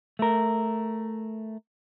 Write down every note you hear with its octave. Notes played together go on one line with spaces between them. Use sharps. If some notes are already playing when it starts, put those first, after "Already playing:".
A3 A#4